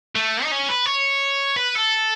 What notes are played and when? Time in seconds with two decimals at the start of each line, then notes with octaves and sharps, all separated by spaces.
0.16 A3
0.44 D#4
0.52 C#4
0.69 B4
0.86 C#5
1.56 B4
1.75 A4